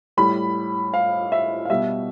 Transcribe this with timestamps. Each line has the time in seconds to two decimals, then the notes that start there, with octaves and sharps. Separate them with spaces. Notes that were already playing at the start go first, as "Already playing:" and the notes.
0.17 A2 G3 B5
0.94 F5
1.32 E5
1.65 F5
1.69 B2 G3 E5